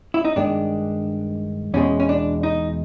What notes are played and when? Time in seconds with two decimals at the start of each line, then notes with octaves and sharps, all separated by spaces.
0.14 E4
0.25 D#4
0.36 G2 D#3 G#3 D4
1.74 E2 B2 G#3 C#4
2.00 C#4
2.09 D4
2.43 D#4